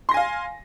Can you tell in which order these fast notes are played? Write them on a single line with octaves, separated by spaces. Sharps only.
C6 A#6 G#5 F5